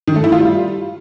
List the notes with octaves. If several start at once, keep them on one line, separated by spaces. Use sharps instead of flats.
D#3
A3
E4
F4
G3